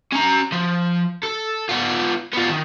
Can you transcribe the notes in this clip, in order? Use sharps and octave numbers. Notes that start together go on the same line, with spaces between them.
C#4 A#5
F3
A4
B3 F4
B3 F4
D#3